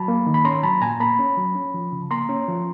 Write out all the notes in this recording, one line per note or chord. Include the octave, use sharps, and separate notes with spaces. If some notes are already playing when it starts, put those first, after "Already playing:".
Already playing: F#3 A5 B5
A#3
D#3
B5
C#4 A#5 C6
F#3 A5 B5
A#2 G#5 A#5
A#3 A5 B5
C#4
F#3
C#4
F3
C#3
A#3 A#5 C6
C#4
F3